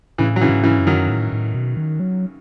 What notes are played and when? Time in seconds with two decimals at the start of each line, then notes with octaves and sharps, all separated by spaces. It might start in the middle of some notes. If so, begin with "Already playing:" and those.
0.18 A2 C#3 E3
0.36 F#3
0.41 C#3 E3
0.49 G#2
0.64 C#3 E3
0.79 F#2
0.87 D#3 F#3
1.09 A2
1.32 A2
1.55 B2
1.77 D#3
2.00 F#3